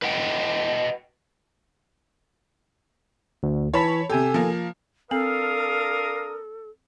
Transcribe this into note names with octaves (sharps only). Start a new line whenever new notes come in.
B4 D#5 F#5 G5
D2
E3 C#5 A5 B5 B6
C3 G4 A4 G#5
F3 A#3
C4 D4 A4 A#4 F5 D#6